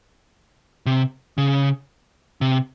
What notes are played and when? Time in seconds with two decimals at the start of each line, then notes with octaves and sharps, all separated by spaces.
0.86 C3
1.38 C#3
2.41 C3